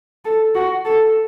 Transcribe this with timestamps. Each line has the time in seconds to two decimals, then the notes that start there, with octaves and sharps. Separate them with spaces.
0.25 A4
0.55 F#4
0.85 A4